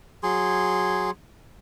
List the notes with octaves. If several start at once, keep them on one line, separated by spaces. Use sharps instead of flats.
F#3 G#4 C6